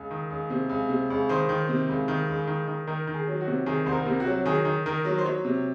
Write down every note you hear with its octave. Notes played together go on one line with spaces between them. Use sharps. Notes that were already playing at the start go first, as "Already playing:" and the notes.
Already playing: C#2
D#3
C#2
C3
C#2
C3
C#2
D#3 C5
D#3
C3
C#2
D#3
C#2
D#3
D#3
D#3 A#4
D#3
G#4
F#3
F#4
C3
D#3 G#4
C2 C5
A#4
C3
F#4
F#3
D#3 G#4
D#3
D#3 A#4
F#3
C5
F#3 C#5
C3